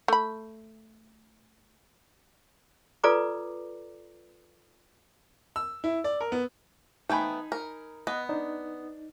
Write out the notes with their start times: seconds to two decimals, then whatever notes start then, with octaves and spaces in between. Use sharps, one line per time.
0.08 A3 B5
3.04 F4 A4 B4 D5 A#5 D6
5.56 E6
5.84 E4
6.04 D5
6.21 A#4
6.32 B3
7.09 A3 B3 D#4 G5 G#5 B5
7.52 A#4
8.07 B3 D#5
8.29 D4 D#4